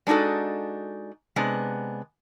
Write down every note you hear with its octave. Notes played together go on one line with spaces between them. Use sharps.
G#3 D4 D#4 F#4 A4
C3 G#3 B3 D4